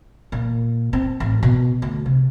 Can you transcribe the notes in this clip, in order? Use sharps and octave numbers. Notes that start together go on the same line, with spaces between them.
A#2
C4
A1
B2
D2
C3